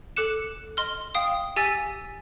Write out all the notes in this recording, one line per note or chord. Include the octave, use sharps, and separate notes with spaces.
A4 D6 F#6 C#7 E7
D#5 C6 F6
F5 G5 D#6
G4 G#5 E6 A6 B6 D#7